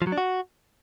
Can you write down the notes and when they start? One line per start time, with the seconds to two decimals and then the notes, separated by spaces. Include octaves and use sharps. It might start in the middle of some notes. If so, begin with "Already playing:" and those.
0.02 F3
0.07 F#3
0.12 D4
0.18 F#4